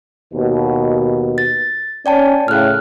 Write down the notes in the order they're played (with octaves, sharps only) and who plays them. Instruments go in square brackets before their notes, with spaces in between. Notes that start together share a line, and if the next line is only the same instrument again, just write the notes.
[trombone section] D#2 B2
[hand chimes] A6
[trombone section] C#4 [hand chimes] D5 G5 A5
[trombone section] A2 C#3 [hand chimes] F6 F#6